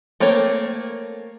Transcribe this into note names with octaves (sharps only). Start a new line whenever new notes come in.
A3 A#3 C4 C#5